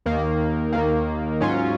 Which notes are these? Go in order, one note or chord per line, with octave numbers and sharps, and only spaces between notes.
D#2 D#3 A#3
D#2 D#3 A#3
G#2 F#3 C#4 F4